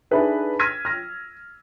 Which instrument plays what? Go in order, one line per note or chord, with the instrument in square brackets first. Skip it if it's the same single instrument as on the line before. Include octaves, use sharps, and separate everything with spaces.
[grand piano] D4 D#4 G#4 A4 B4 E5
E6 F6 G#6 A#6 B6 D#7
F6 A#6